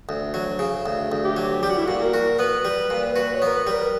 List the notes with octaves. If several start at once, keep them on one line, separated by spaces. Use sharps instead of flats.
D2
F#3
C#3
D2
D2
G4
F#3
G3 G4
F#4
E4
A#2 F#4
A#4
F#4
B3 B4
G3
A#2
F#4 B4
C#5
B3 A#4
B4
G3
A#4